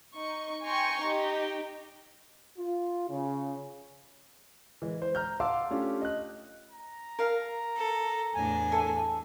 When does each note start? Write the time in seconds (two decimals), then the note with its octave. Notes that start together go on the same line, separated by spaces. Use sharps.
0.13 D#4 C#6
0.63 G5 G#5 A#5 C6 C#6
1.02 D#4 G4
2.58 F4
3.10 C#3
4.82 E3 G#3
5.02 C5
5.15 A#5 F6 G6
5.40 F5 F#5 A5 C6 D6 E6
5.71 A3 C#4 D4 F4 G4
6.01 D#5 F#6
6.71 A#5
7.19 A#4 F5
7.77 A4
8.34 E2 A2 D4 G#5
8.72 A4 E5